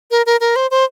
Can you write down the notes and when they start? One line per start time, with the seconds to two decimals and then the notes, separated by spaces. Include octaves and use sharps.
0.11 A#4
0.26 A#4
0.40 A#4
0.56 C5
0.71 C5